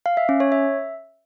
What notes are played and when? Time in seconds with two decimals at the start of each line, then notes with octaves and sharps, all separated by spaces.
0.06 F5
0.17 E5
0.29 C#4
0.40 C#5
0.52 E5